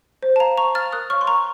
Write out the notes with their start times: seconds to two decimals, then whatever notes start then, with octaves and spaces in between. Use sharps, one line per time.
0.23 C5
0.36 A5
0.40 F5 A#5
0.57 C5 A#5 C#6
0.75 F5 F6 A6
0.92 A#4 D#6 F#6
1.10 C#5 F5 C#6 F6
1.21 C6
1.27 A#4 A#5 C#6